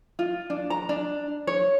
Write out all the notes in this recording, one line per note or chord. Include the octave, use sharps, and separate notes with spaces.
F4
D4
A#5
D4
C#5